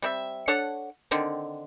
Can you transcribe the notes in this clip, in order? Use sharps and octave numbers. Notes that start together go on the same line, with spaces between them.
G3 C4 E5
D4 A4 C#5 F#5
D3 D#3 C4